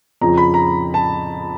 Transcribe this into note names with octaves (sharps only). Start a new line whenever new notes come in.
F2 C#3 F3 A#5
B5
A#5
A5